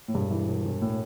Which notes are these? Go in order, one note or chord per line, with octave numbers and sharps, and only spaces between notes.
A2
E1 G2
E3
E1
E1
A2